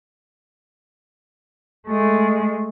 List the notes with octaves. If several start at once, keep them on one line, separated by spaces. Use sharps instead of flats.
G#3 A3